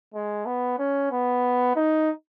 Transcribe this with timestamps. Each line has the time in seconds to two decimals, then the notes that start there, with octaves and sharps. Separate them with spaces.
0.14 G#3
0.46 B3
0.79 C#4
1.12 B3
1.76 D#4